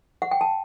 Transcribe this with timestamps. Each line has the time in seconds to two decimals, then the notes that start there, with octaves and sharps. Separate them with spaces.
0.22 F#5
0.31 G5
0.41 A5